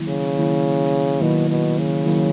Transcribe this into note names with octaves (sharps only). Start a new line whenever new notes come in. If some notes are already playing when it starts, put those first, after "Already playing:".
Already playing: D#3 F#3 A#3 E4
C#3
D#3 F#3 A#3 E4
B2 D#3 F#3 A#3 E4
B2
C#3
D#3 F#3 A#3 E4